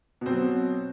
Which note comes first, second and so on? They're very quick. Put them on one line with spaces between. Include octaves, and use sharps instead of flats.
B2 C4 F#3